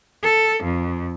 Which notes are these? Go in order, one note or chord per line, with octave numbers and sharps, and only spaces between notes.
A4
F2